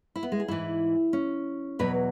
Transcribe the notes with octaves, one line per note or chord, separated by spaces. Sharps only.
E4
B3
G#3
G#4
G#2 E3 E4
C#4
E2 B2 F#3 B4